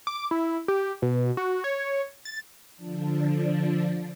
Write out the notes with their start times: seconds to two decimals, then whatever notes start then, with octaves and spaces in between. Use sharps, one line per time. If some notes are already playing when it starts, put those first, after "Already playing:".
0.07 D6
0.31 E4
0.68 G4
1.02 B2
1.37 F#4
1.64 C#5
2.25 A6
2.76 D3 F3 D4